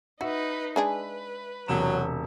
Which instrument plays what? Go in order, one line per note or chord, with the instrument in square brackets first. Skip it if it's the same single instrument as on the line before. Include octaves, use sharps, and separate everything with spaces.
[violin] D#4 B4 [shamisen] F#4 [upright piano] E5
[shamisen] G#3 D4 G#4 [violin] B4
[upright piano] E1 C3 E7 [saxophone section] F#3